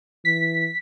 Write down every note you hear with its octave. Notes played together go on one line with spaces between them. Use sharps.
E3 B6